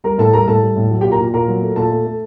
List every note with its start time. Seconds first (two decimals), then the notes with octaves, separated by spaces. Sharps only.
0.04 G3 A#4 A#5
0.18 A2 A4 A5
0.33 G3 A#4 A#5
0.47 A2 A4 A5
0.62 G3
0.76 A2
0.90 F#3
1.01 A#2 G4 G5
1.12 A#4 A#5
1.19 A#2
1.34 A#2 A#4 A#5
1.48 F#3
1.62 A3
1.76 A#2 A4 A5
1.91 A3
2.05 A3